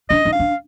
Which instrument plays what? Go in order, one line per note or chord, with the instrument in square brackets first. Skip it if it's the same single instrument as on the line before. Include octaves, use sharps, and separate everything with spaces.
[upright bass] D4 [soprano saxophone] D#5
[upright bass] D#4
[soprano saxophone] F5
[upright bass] D4